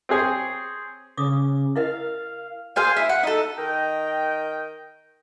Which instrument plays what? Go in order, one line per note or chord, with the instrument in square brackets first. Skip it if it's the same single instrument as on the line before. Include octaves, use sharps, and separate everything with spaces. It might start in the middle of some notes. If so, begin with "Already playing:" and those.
[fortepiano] C4 G4 G#4 C#5
[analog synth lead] C#3 [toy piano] D6 D#6
[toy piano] E4 A#4 D#5 [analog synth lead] F5
[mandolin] G#4 C5 F5 G#5
E4
F#5
D#4 A4
[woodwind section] D#3 A#4 D#5 G5